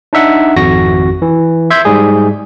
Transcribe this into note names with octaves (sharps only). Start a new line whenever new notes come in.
D4 D#4 E5 F#5
G#1 F2 F#4 A#6
E3
E5 C6 G6 G#6
G#2 G3 G#4